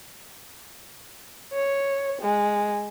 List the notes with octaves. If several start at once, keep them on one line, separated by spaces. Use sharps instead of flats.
C#5
G#3